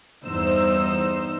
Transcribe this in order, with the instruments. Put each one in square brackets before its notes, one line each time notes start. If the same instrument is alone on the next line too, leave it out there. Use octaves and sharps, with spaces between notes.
[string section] E2 G2 D#4 C5 E6